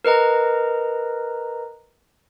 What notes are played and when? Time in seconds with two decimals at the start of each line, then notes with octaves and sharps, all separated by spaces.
0.05 A#4 B4 D#5 A#5